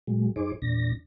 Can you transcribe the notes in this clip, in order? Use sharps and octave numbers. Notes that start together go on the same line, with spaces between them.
A#2 F#3 G#3
F#2 D#4 G#4 C5 D6
E2 A#2 D4 A#6